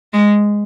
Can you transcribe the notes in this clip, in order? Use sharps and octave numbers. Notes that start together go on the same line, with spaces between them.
G#3